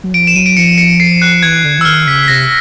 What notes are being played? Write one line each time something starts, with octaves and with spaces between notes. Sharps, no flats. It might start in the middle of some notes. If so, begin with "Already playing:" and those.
F#3
F3 D7
E7
F#3 D#7
D7
F3 C#7
C#7
C7
F#6
E3 G#6
D3
E3 E6
D#3 F6
C#3 B6
B6
C3 A#6